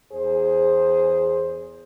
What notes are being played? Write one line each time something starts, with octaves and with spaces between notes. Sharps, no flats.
E2 G#4 C5